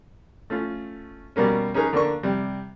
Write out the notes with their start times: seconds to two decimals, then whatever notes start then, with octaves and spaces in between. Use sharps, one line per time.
0.50 A3 C#4 F4
1.36 B2 G3 A#3 C#4
1.74 C#4 D#4 G#4 A#4 B4
1.93 D3 A#3 D4 C#6
2.23 C3 G3